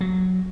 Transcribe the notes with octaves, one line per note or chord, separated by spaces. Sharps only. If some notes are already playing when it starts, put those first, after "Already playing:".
F#3